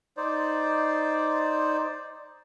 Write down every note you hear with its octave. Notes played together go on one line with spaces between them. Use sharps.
D#4 C5 D5